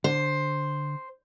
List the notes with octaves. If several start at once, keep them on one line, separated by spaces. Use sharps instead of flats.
D3 C5